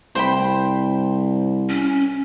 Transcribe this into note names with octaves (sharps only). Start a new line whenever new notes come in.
C2 C5 G5 B5
C#4